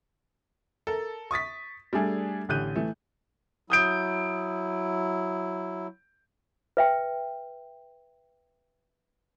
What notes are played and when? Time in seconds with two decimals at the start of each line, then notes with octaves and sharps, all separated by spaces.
0.87 A4 A#4
1.31 C#6 D#6 A6 B6
1.93 G3 A3 D4 G#4 A4
2.49 A1 D3 G4 F#6 G6 D#7
2.76 E3 A3
3.70 F#3 E4 D#6 G6 D7
6.77 B4 E5 G5